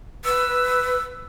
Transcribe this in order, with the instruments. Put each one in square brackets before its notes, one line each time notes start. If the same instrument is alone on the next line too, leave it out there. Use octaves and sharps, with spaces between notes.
[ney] B4 [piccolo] E6